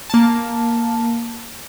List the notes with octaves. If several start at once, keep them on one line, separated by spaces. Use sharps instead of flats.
A#3 A5